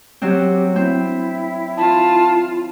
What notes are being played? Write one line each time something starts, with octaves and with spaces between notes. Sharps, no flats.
F#3 C4 G4
C4 E4
F4 A5